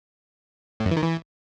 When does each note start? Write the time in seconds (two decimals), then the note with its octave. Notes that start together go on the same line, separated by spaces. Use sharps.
0.80 A2
0.86 F#2
0.91 E3
0.97 D#3
1.02 E3